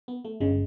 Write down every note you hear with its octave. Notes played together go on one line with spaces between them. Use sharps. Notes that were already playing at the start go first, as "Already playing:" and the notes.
B3
A3
G1 C#3 G#3